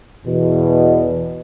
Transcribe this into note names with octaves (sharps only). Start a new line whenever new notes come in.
E2 B2